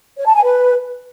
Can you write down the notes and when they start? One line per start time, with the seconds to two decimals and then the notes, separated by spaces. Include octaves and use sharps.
0.18 C#5
0.26 A5
0.35 G#5
0.43 B4